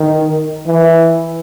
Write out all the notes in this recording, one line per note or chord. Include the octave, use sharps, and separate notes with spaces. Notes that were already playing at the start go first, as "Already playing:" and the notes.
Already playing: D#3
E3